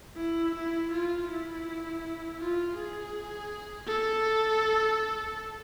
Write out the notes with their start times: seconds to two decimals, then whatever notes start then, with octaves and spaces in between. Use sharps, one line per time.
0.17 E4
0.55 E4
0.92 F4
1.28 E4
2.39 F4
2.76 G#4
3.86 A4